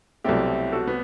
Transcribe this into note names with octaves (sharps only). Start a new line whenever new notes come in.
C2 B2 F#3 A3 C4 E4 G4
F#4 A4
B3